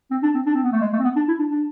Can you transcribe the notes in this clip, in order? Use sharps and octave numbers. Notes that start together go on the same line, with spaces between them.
C4
D4
C4
D4
C4
B3
A3
G#3
A3
C4
B3
D4
E4
D4
D4